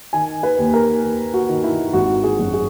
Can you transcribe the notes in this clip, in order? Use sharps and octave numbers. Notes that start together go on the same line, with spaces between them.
D#3 G#5
B4
D#2
A#4
D#2
F#4
D#3
E4
G#1 F#4
G#4
F#2
G#4